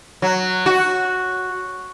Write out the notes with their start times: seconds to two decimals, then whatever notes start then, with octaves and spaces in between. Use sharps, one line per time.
0.22 F#3
0.66 F#4